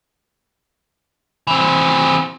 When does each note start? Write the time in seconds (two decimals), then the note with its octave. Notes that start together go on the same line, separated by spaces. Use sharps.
1.47 E3 C4